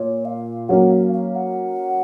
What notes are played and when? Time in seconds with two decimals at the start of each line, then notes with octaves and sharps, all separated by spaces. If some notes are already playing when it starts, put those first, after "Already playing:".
Already playing: A#2 C#5
0.25 F5
0.69 F#3 A#3 C#4 F#5
0.92 F5
1.13 F5
1.35 F#5